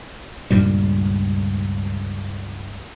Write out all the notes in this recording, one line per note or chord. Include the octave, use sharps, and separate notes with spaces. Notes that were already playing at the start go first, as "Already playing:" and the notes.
C#2 G2 A#2 G3